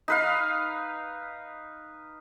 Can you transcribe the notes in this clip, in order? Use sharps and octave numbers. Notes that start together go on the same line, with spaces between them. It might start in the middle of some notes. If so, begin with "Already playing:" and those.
D#4 B4 F5